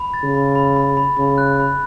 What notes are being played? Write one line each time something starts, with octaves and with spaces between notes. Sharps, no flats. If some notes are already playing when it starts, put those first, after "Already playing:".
Already playing: B5
A6
C#3
B5
B5
B5
B5
C#3 B5
F#6
B5